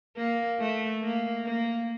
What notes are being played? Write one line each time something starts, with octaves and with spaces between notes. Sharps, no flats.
A#3
A3
A#3
A#3